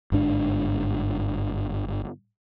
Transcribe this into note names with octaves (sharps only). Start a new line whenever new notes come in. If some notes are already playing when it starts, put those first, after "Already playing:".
G1 G#2 D4